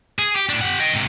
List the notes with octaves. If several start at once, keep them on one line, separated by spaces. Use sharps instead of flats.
G#4
G4
A2 D4
G4 F#5
D#5 G5
G#2 C3